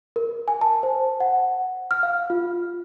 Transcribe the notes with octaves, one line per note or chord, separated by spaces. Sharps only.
A#4
G#5
A5
C5
F#5
F6
F5
F4